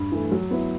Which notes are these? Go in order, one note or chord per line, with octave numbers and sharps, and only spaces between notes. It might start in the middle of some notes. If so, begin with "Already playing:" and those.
Already playing: G2
E3 A3
F#3
B3 E4